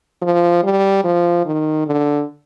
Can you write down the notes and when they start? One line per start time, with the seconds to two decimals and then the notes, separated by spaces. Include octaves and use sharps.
0.22 F3
0.63 G3
1.04 F3
1.45 D#3
1.86 D3